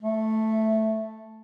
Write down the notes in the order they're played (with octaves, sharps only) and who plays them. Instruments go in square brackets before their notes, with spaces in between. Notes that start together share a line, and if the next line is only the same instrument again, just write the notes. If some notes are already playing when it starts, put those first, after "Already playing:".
[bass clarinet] A3